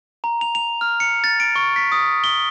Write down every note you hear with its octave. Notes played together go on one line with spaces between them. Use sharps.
A#5
F7
F7
F6
C#7
A6
D7
C#6
B6
D#6
G7